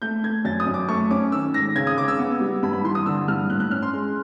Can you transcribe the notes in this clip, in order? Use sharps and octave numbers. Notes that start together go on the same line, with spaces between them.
A3 G6
A3 G#6
F#2 A6
D#6
F#2
D6
A3 C#6
C#4 D6
D#3 E6
G#2 A#6
C#3 G#6
D#6
C#3 D6
E6
B3
G3
G2 B5
B5
E3 C6
D#6
D3 E6
G2 F6
A2 F#6
F#6
C#4 F6
C6
G#3